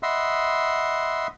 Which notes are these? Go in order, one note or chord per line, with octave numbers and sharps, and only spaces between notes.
D#5 E5 F#5 B5 C6